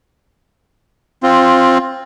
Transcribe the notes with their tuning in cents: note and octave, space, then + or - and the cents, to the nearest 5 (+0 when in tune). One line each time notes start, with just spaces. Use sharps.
C4 +15 F4 +0